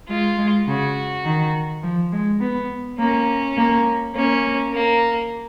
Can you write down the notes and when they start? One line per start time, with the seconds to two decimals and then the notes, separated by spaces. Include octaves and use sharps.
0.08 G#3 F4
0.38 G#3
0.67 C#3 F#4
1.25 D#3
1.83 F3
2.12 G#3
2.41 B3
2.99 A#3 C#4
3.57 A#3
4.15 A#3 C#4
4.73 A#3